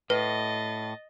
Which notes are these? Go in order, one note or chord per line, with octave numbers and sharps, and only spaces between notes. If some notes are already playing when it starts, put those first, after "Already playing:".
A2 B4 D#5 A6